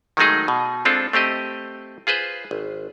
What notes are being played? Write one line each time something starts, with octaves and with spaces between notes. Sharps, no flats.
D#3 F#3 G#3 A3 D#4 G#4
B2
G#3 C4 D4 F4 A4
A3 C4 G4 D#5
F4 G#4 B4 C5
G#1